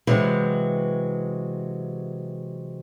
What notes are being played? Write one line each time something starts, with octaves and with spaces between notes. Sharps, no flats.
C3 E3 F#3 G#3